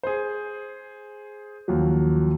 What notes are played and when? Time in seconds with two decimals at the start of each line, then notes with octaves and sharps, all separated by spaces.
0.03 G#4 C5
1.68 D#2 F3 F#3